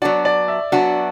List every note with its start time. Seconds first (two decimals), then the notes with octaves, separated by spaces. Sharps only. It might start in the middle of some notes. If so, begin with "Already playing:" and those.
0.02 F#3 B3 D4 F#4 D5
0.25 D5
0.48 E5
0.72 F#3 B3 D4 F#4